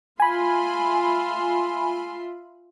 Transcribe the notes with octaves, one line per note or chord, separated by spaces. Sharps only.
F4 E5 G#5 B5 C6